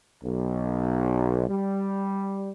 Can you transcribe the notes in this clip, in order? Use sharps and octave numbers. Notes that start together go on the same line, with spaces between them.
B1
G3